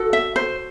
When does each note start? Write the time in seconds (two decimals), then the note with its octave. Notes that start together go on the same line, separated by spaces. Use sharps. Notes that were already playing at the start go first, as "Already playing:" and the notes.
Already playing: F#4 A4
0.13 E5
0.36 C5